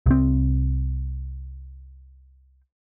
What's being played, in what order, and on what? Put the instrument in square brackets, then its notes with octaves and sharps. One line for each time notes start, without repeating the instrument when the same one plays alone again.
[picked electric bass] C2 C4